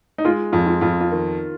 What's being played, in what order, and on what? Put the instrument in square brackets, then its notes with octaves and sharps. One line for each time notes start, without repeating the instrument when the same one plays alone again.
[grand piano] D#4
[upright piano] G#3 [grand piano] F4
[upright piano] F2 [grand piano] F4
[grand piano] F4
[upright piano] F2 [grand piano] F4
[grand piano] F4
[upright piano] D#3